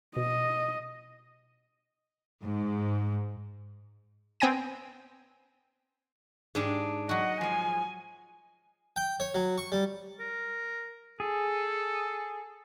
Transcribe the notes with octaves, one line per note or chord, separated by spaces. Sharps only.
B2 D#5
G#2
B3 C4 G5 G#5 A#6 D#7
G#2 G#3 D4 G4
F#3 F#4 D#5 F#5
F3 G#3 G#5
G5
C#5
F#3
C#6
G3
A#4
G#4 A4